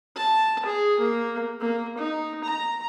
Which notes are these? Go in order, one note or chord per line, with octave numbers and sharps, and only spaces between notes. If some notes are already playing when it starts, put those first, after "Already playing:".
A5
G#4
A#3
A#3
D#4
A#5